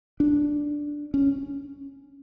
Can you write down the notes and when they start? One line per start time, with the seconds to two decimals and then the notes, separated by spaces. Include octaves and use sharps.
0.20 D4
1.14 C#4